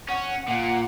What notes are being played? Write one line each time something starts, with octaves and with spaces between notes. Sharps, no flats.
C#4 F#5
A#2 F#5